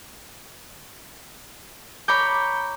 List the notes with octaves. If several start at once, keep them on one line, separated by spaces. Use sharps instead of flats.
C#5 A#5 B5 D6 G6